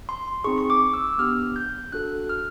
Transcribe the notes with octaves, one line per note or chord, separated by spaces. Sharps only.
C6
C4 D#4 G#4 C#6
C#6
D6
E6
B3 D4 G4 F6
G6
D4 F#4 A4 F#6
F6